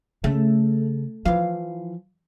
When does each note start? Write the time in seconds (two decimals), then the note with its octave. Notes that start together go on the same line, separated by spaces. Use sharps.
0.24 C#3 A3
1.26 E3 F3 F5